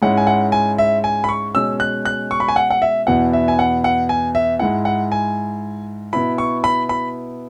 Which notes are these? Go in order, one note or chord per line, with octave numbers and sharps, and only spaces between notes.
G#2 G#3 C#4 E4 F#5
G#5
F#5
G#5
E5
G#5
B5
C#6
B2 G#3 C#4 E6
F#6
F#6
C#6
B5
G#5
F#5
F#5
E5
E2 B2 B3 E4 F#5
E5
G#5
F#5
F#5
G#5
E5
G#2 G#3 E4 F#5
F#5
G#5
B2 B3 E4 B5
C#6
B5
B5